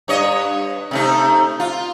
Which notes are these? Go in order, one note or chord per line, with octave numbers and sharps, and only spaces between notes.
G2 C#5 D#5
C3 A3 D#4
F4